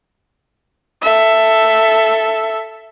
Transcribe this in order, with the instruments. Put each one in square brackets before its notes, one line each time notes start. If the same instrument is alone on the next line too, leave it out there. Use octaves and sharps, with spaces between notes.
[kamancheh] A4 E5